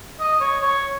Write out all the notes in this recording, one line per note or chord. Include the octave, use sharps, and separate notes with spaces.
D#5
C#5
C#5